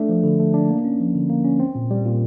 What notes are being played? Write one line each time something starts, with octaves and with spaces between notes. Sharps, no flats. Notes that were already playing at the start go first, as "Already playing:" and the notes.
Already playing: A3 D4
F3
D3
A3
D4
A#3
C#4
F3
D3
A#3
C#4
C4
A#2
G3
A#2